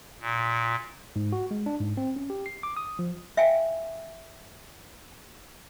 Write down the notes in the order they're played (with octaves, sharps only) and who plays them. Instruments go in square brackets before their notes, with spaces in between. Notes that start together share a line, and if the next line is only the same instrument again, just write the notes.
[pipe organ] A#2
[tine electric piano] G#2
F#4
G#3
D4
G#2
C4
C#4
G4
C7
D6
D#6
F3
[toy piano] E5 F5 G5 G#5